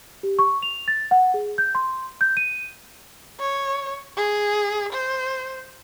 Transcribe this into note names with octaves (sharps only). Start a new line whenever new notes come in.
G4
C#6
F7
A6
F#5
G#4
G6
C6
G6
D#7
C#5
G#4
C5